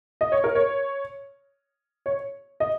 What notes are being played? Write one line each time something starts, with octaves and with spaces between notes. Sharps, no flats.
D#5
C#5
A#4
C#5
C#5
D#5